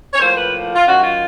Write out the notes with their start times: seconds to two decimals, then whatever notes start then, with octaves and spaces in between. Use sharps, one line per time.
0.13 C#5
0.20 A2 F3 A#3 C5
0.37 B4
0.76 F4
0.87 F#2 D#3 F#3 F#4
1.02 F4